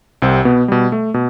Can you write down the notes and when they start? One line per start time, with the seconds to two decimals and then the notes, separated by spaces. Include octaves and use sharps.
0.22 C2 C3 C4
0.45 B2 B3
0.68 B2 G3
0.92 A3
1.14 B2